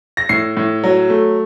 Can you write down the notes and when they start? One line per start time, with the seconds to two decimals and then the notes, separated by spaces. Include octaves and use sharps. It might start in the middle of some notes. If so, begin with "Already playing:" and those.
0.17 A#6
0.29 A2 C7
0.57 A2
0.84 F#3
1.10 A3